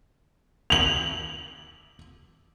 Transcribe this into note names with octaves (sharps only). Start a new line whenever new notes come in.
F7 F#7